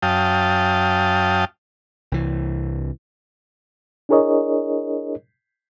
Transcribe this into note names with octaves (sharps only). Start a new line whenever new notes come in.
F#2 F5 G5 A5 D#6
C2 E3
D4 E4 G#4 A#4 C#5 D#5